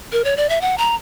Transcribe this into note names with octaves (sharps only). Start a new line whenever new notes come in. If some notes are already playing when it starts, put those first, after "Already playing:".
A#4
C#5
D5
E5
F#5
A#5